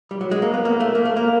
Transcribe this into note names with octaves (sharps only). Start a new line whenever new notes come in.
G3
F#3
G#3
A#3
B3
A#3
A3
A#3
A3
A#3